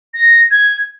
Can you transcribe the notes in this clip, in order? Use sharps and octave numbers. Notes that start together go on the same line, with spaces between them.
A#6
G#6